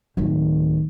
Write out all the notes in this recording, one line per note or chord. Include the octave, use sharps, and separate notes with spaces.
D1 D#3